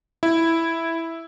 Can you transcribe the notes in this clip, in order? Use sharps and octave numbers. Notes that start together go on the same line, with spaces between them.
E4